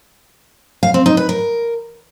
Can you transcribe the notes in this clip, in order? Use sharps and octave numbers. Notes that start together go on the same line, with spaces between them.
F5
C4
D#4
B4
A#4